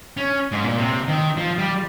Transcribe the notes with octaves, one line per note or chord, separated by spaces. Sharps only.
C#4
G#2
A#2
C3
D#3
F3
G3